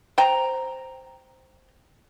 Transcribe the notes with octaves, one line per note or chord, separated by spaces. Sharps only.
C5 G5 A#5